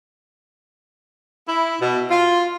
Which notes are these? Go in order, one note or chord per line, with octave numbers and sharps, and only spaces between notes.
E4
B2
F4